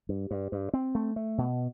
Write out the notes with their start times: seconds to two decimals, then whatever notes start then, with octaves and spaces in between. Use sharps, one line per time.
0.09 G2
0.31 G2
0.52 G2
0.73 C4
0.95 A3
1.16 A3
1.38 B2